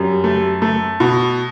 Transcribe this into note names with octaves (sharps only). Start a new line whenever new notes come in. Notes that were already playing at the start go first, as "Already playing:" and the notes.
Already playing: F#2 G3
A3
A3
B2